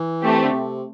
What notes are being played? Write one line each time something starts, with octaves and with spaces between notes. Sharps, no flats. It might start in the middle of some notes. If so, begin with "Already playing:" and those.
Already playing: E3
A3 C4 G4
D3
C3